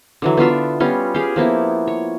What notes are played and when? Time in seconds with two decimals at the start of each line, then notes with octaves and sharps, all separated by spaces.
0.22 D3 E3 F#3
0.37 B3 D4 F4 E5
0.80 G3 B3 C#4 F4
1.14 G4 G#4 F5
1.36 F3 A#3 B3 E4
1.88 C#5